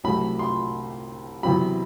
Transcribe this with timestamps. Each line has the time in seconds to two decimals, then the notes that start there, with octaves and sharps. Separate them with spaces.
0.04 C2 C3 F#3 A3 B5
0.39 C6
1.43 E2 C3 F#3 B5